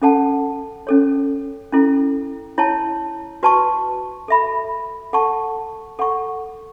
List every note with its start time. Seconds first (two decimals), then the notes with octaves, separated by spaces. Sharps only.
0.02 C#4 A4 F#5 A5
0.87 C#4 A4 C#5
1.72 C#4 E4 A4
2.58 E4 C#5 A5
3.43 F#4 B4 A5 C#6
4.28 A4 E5 B5
5.13 A4 F#5 A5 C#6
5.99 A4 F#5 C#6